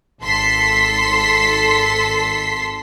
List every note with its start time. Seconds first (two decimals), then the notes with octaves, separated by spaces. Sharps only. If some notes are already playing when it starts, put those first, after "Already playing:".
0.22 G#1 A4 C6 B6 C7